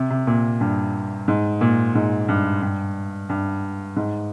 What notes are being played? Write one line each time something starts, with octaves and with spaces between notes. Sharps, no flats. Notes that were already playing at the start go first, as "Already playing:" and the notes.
Already playing: C3
C3
A#2
G2
G#2
A#2
G#2
G2
G2
G2
G#2